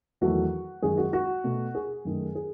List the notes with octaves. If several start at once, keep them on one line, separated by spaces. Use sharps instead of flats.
E2 D#3 F#3 A3 F#4
F#2 D#3 G#3 G#4
F#4
F#4
B2 A3
G#4
F#2 D#3 A3
G#4